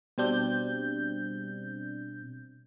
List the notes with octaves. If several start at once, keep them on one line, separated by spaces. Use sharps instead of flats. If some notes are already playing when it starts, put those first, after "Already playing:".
B2 G3 C4 D4 G6